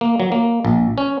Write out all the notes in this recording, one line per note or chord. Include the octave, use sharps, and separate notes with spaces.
A#3
F#3
A#3
A#1
C#4